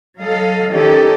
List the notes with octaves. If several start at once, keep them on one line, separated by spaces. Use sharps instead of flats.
F#3 A4 D#5 F5
D#3 C#4 G4 A4 D#5